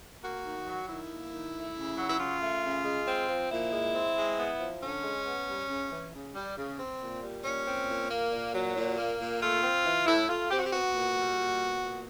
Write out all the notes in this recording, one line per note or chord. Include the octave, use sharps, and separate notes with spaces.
A#3 F#4
D#3
F#3
D#3 E4
A#3
D#3
A3
C#3
F#3
E4
C#3 F4
A3
C#3
G#3
C4
F3
A#2 E4
G#3
C4
G#3
B3
F3
D3 C#4
G#3
B3
G3
C#3
E3
C#3
G3
C#3
C4
A#2
G3
A#2 C#4
C4
A#2
A#3
A#2
F#3
A#2
A#3
A#2
A3 F4
C4
E3
A2 E4
A3 F4
C4 G4
F#4
G4
B3 F#4
A#2
G3
A#2
B3
A#2